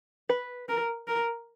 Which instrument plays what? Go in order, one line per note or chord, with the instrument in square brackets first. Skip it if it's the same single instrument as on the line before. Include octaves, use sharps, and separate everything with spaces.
[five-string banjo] B4
[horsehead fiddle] A#4
A#4